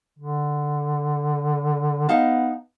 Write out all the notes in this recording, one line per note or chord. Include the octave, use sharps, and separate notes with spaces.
D3
B3 D#4 F5 A5